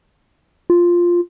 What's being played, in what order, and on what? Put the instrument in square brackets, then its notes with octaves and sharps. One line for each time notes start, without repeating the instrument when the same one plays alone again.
[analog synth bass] F4